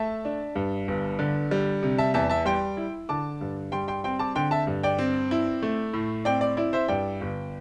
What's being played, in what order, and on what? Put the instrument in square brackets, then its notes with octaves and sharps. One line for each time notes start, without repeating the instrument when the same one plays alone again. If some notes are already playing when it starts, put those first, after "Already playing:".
Already playing: [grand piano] A3 E5 A5
D4
G2
G1
D3
G3
C3
E5 A5
E2 E5 A5
E5 A5
G3 G5 C6
E4
D3 A5 D6
G2
G3 G5 C6
G5 C6
C4 G5 C6
A5 D6
D3 G5 C6
E5 A5
G2
D5 G5
C4
E4
A3
A2
C4 D5 G5
D5
E4 D5
C5 E5
G2 D5 G5
G1